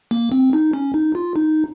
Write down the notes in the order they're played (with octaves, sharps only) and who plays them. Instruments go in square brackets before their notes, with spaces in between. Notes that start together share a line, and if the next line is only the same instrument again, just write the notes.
[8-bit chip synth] A#3
C4
D#4
C#4
D#4
F4
D#4